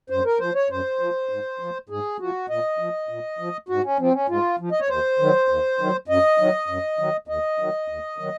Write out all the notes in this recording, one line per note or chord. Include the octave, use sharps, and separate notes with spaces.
F#2 C5
A#4
F3 C5
C#5
F#2 C5
F3
G#2
F3
G#2 G#4
F3 F#4
A#2 D#5
F3
A#2
F3
G#2 F#4
C#4
F3 C4
C#4
G#2 F4
F3
D#5
C#5
D#2 C5
D#3 F#3
D#2
D#3 F#3
F#2 D#5
D#3 F#3
F#2
D#3 F#3
D#2 D#5
D#3 F#3
D#2
D#3 F#3